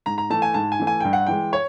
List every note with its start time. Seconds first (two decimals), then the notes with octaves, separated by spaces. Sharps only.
0.06 G#2 A#5
0.18 A#5
0.30 E3 A3 A5
0.42 G#5
0.54 G#2 A5
0.72 G#5
0.79 E3 A3
0.87 G#5
1.00 G2 G5
1.13 F#5
1.27 E3 G#3 G5
1.53 C#5